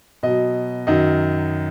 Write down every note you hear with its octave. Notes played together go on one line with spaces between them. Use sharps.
B2 F#3 D#5
F#2 D#3 F#3 D#5